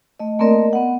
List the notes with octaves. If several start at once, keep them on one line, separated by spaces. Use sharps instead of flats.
A3 D#5
A3 A#3 C4 A#4 D5 D#5
B3 F#5